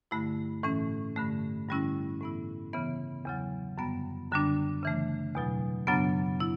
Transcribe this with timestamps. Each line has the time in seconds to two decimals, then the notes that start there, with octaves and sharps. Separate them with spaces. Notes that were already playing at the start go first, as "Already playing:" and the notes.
0.11 G2 D3 A3 E4
0.63 A2 E3 A3 C#4
1.16 G2 D3 A3
1.69 G2 D3 G3 C#4 E4
2.20 A2 E3 B3 E4
2.74 C#3 E3 B3
3.25 E2 C#3 F#3
3.78 F#2 D3 G3 B3
4.31 F#2 D3 G3 D4
4.83 C#3 E3 A3
5.35 E2 B2 F#3
5.87 F#2 C#3 F#3 B3 D4
6.40 E4